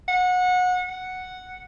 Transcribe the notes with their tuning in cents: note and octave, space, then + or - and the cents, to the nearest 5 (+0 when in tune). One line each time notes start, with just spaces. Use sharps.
F#5 -25
F#5 +0